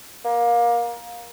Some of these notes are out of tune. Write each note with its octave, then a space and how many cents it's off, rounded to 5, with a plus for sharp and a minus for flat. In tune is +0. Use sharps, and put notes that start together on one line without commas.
A#3 +20